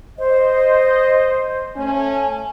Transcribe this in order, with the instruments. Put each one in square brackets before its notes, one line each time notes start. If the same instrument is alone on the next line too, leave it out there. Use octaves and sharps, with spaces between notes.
[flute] C5 [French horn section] D#5
[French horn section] A3 C#4 [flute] G#5